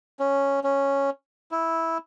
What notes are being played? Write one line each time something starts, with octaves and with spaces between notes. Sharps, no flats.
C#4
C#4
E4